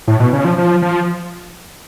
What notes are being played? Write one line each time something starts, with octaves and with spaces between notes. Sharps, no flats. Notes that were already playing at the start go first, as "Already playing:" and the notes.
A2
B2
C#3
F3
F3
F3